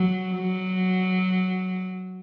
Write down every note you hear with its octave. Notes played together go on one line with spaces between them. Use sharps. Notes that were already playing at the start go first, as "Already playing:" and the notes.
Already playing: F#3
F#3